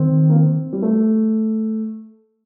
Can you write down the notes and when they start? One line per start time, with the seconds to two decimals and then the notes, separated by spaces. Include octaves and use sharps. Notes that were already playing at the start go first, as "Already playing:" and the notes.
Already playing: D#3 C4
0.30 A#3
0.36 C4
0.73 G3
0.82 A3